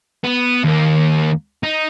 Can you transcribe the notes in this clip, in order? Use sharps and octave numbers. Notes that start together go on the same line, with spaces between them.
B3
D#2 A#3
D#4